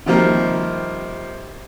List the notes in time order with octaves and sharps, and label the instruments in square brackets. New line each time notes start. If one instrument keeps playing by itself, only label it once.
[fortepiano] C3 D#3 F3 G3 A#3